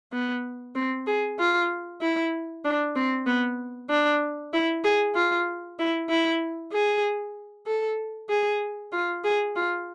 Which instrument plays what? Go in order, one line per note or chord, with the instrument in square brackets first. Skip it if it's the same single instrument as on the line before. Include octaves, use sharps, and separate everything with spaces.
[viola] B3
C4
G#4
F4
E4
D4
C4
B3
D4
E4
G#4
F4
E4
E4
G#4
A4
G#4
F4
G#4
F4